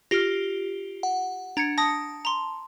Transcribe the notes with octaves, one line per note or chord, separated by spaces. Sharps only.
F4 G4 F6 A#6
F#5
D4 A#5 G#6 C#7
A5 D#6 A#6
A#5 C6